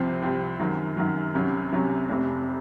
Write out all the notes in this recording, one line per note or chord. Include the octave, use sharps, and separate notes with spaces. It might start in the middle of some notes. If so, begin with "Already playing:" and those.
Already playing: C2 C3 F3 C4
C2 C3 F3 C4
F#2 D#3 F#3
F#2 D#3 F#3
C2 C3 F#3 C#4
C2 C3 F#3 C#4
F1 F2 C3